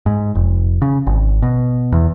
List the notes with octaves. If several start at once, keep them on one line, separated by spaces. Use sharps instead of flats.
G#2
F1
C#3
G#1
B2
E2